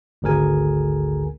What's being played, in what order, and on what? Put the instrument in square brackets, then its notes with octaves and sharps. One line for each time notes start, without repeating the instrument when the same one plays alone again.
[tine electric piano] G#1 D2 G#4 A#4 G#5